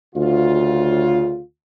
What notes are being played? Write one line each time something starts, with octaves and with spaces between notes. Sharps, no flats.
D2 C#3 F4